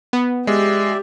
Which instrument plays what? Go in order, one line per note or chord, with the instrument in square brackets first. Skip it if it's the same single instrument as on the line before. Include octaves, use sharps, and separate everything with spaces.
[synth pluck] B3
[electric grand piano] G#3 [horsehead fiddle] G4 [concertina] D5 E5